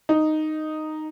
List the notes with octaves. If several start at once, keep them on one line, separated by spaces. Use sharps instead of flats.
D#4